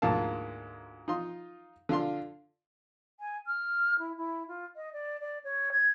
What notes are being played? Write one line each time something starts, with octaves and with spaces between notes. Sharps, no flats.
D2 G#2 A#3 F4 F5 A5
D#4 F4 C6
D3 F4 F5 C6
G#5
F6
E4
E4
F4
D#5
D5
D5
C#5
G#6